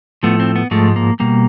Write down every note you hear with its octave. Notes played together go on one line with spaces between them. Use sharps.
A2 F3 A3 B3
C4
B3
G#2 F3 G#3 A3
A#3
B2 G3 A#3